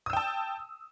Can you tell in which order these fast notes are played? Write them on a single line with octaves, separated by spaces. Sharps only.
D#6 E6 G5 A5